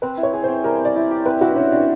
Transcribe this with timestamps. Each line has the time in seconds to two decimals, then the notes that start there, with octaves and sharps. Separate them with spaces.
0.02 C4 B4
0.17 E4
0.23 C#5
0.33 G#4
0.44 C5
0.48 C4
0.63 G3 A#4
0.80 C4 D5
0.96 E4
1.11 G4
1.25 C4 B4
1.41 E4 F#4
1.52 D4
1.56 C#4 G4
1.72 C4 D4